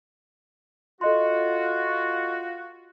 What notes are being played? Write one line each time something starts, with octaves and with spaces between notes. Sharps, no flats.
F4 F#4 A4 D#5 C6